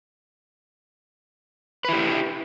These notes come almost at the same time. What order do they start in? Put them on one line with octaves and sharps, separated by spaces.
B4 E4 G4